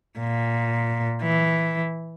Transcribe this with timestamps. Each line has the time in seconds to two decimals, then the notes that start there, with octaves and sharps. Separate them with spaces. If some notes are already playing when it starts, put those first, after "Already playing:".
0.19 A#2
1.22 E3